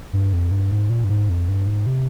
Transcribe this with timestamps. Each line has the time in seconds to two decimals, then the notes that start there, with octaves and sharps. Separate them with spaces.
0.13 G2
0.33 F2
0.51 G2
0.71 G#2
0.90 A#2
1.04 G2
1.09 G#2
1.29 F2
1.49 G2
1.67 G#2
1.86 C3